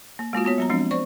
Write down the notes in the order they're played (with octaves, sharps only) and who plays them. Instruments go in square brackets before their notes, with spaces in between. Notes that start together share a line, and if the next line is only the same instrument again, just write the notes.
[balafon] A#3
G#3 A#3 F4 F#4
B3 F#4 C#5
F#3 B3 A#5
F3 G#3 C4 D4
C5 D5 C#6